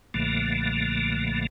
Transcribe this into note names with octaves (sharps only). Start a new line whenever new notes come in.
B1 A#2 D3 F3 A3 A#3